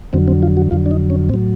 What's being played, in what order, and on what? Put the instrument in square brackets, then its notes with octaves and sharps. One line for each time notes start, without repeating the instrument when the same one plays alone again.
[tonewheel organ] F2 D3 F#3 C4
C4
F4
F#4
F2 D3 F#3 F4
D4
D#4
C#4
A2 C4
F#3